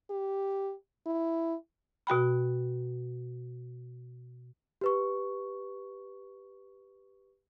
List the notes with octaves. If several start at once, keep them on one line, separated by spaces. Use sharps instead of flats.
G4
E4
B2 F#4 G5 B5
G4 B4 C#6